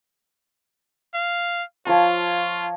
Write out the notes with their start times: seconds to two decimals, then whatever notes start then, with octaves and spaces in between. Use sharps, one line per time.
1.14 F5
1.87 F3 F4 C#5 A#5